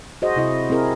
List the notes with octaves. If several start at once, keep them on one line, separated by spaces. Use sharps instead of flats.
F#4 G#4 C5 D#5
C3 E4 D#5
C4 E4 G#4 A#4